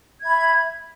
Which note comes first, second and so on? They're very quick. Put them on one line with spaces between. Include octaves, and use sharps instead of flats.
G#6 E5 B5